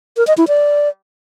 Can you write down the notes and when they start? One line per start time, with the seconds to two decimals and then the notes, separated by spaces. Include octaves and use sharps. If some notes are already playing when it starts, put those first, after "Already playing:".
0.17 A#4
0.27 D#5
0.38 E4
0.48 D5